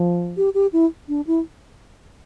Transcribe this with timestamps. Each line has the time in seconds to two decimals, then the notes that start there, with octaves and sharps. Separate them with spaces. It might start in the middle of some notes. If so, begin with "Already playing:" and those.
Already playing: F3
0.37 G4
0.54 G4
0.73 E4
1.09 D4
1.27 E4